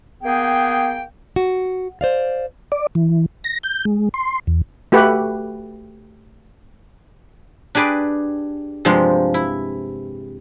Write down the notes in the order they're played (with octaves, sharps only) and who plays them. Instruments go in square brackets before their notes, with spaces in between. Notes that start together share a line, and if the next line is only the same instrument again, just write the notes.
[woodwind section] A#3 B3 G#4 G5
[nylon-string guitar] F#4
C5 D5 F5
[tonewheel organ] D5
E3
A#6
G6
G#3
C6
E2
[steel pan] A3 F#4 G4 B4
[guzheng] D4 G4 G#4 B4 D5
G2 C3 F3 G#3
E4